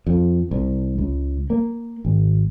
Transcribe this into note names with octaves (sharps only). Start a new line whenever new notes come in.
F2
C2
C#2
A#3
G#1